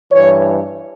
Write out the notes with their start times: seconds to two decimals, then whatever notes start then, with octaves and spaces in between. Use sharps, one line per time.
0.12 G2 E3 C#5